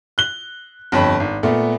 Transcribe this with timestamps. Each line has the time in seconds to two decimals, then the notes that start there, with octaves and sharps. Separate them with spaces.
0.18 F#6 G7
0.92 G1 F2 C#5 B5
1.20 G#1
1.43 A#2 A3 B3